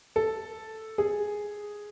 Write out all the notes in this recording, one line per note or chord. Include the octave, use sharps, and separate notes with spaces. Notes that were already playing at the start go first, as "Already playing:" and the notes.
A4
G#4